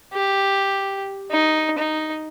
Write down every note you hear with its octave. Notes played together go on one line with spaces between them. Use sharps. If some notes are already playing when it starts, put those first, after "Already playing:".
G4
D#4
D#4